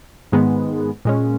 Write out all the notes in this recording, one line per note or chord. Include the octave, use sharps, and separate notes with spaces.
G#2 D#3 G#3 B3
A#2 G#3 C#4